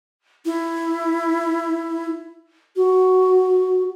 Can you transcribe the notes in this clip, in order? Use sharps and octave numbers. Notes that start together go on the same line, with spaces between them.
E4
F#4